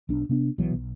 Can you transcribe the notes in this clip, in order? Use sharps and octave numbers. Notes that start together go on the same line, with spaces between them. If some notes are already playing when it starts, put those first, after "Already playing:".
B1 D4
C3 B3 D4
B1 B2 E3 F#3
B1